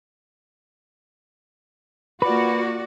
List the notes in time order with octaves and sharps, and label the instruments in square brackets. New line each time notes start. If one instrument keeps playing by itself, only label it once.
[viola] A#3 F4 [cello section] F#4 [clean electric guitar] B4 [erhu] D5